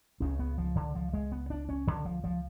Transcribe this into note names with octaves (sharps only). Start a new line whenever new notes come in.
C#2 C#3 C#4
B3
F3
D3
F3
G#3
B3
D4
C#4
D3
F3
F3